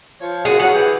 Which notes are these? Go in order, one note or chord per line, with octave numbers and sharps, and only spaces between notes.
F3 C#5
F#2 C#3 F#4 G#4
E2 F#3 G#4 F#5
E3 G4